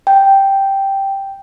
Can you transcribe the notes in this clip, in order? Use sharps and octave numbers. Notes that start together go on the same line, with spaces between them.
G5